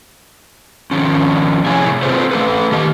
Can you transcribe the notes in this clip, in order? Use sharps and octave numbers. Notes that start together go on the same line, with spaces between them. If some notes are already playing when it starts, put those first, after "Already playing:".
D#3 F3 C#4
A2 C3 E4 G#4 C#5 G#5
C4 F4 G#4 A4 B4 C5
A3 A4 B4
D#3 G4 D#5